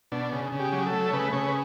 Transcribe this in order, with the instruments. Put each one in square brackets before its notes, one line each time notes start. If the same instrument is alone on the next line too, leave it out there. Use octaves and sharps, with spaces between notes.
[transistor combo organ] B2 D4
C#3
C#3
G4
F#3
A4
A3
C#5
C#3 B4
C#3 C#5
B4